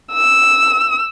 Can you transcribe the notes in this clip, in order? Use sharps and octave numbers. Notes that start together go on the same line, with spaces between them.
E6